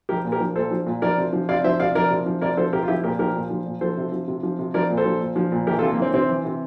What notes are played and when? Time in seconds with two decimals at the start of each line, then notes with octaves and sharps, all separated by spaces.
0.09 F3 G4 A#4
0.25 A#2
0.32 G4 A#4
0.40 F3
0.56 A#2 A4 C5
0.71 F3
0.86 A#2
1.02 F3 A#4 D5
1.18 C3
1.33 F3
1.49 C3 D5 F5
1.64 F3 C5 E5
1.79 C3 D5 F5
1.95 F3 A#4 D5
2.10 C3
2.26 F3
2.42 C3 A#4 D5
2.57 F3 A4 C5
2.73 C3 G4 A#4
2.83 F4
2.88 F3 E4 G4
3.04 A#2 G4 A#4
3.19 F3 G4 A#4
3.35 A#2
3.50 F3
3.66 A#2
3.81 F3 A4 C5
3.97 C3
4.12 F3
4.28 C3
4.43 F3
4.59 C3
4.74 F3 A#4 D5
4.90 A#2
4.97 A4 C5
5.05 F3
5.20 A#2
5.36 F3
5.52 A#2
5.67 E3 G4 A#4
5.79 F4 A4
5.83 C3
5.91 A#3
5.98 E3 C4
6.14 C3 C4
6.29 E3
6.45 C3